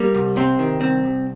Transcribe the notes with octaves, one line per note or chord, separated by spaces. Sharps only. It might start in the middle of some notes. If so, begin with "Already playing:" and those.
Already playing: G3 A#3
C2
C3 C4
D#3
C2 C4
C2